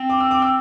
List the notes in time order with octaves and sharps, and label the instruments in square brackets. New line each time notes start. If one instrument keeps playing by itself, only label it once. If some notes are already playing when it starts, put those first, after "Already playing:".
Already playing: [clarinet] C4
[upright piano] D6
E6
D6
E6